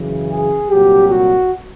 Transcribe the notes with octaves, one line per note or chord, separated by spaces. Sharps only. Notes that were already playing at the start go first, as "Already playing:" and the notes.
Already playing: F#2 C#3 E3
G#4
C2 A#2 F#3 G4
F#4